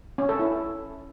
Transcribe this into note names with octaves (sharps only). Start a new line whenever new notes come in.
C#4
A4
E4